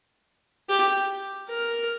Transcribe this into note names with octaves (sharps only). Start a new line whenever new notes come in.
G4
A#4